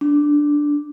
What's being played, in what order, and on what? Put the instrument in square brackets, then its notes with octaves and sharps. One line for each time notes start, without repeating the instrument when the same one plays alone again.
[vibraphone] D4